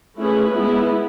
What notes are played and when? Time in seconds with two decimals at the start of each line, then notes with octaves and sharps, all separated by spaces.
0.19 A3 C#4 E4 G#4 B4
0.56 G#3 B3 E4